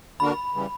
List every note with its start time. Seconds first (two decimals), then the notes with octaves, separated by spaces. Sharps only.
0.20 D3 A#3 D4 F#4 A#4 B5
0.54 C#3 E3 G3